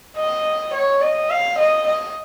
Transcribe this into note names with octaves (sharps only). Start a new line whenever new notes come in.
D#5
C#5
D#5
F5
D#5
D#5